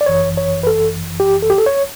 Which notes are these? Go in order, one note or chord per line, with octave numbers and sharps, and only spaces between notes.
D5
G1 F#2 E3 C#5
C#5
B4
A4
G4
A4
G4
A4
C#5